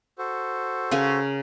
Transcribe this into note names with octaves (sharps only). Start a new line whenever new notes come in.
F#4 A4 C5
C#3 C#4 A#4